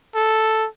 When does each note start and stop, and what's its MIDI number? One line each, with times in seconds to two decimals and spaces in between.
0.15 0.67 69